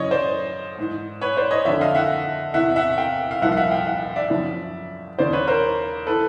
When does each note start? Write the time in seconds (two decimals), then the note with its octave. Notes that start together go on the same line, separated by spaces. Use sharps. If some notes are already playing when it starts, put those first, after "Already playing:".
Already playing: F#2 C#3 E3 C#5 D#5
0.11 C5 D5
0.78 G#2 E3
1.21 B4 C#5
1.37 C5 D5
1.51 C#5 D#5
1.65 F2 D3 F3 D5 E5
1.76 E5
1.81 D#5 F5
1.95 E5 F#5
2.54 E2 C3 E3 E5 F#5
2.76 E5 F#5
2.98 F5 G5
3.31 F5
3.42 C2 A#2 F3 E5 F#5
3.52 F5
3.57 E5 F#5
3.71 F5 G5
3.87 E5 F#5
4.16 D5 E5
4.30 F#2 C#3 F3
5.18 D#2 C#3 E3 C5 D5
5.33 B4 C#5
5.47 A#4 C5
6.07 E3 A4 B4